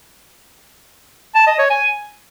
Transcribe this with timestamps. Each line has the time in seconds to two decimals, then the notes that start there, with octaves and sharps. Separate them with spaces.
1.35 A5
1.47 D#5
1.59 C#5
1.70 G#5